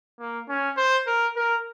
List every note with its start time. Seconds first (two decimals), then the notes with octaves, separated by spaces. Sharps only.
0.20 A#3
0.49 C#4
0.77 C5
1.07 A#4
1.36 A#4